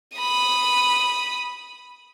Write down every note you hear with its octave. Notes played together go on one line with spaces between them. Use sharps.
B5 D#6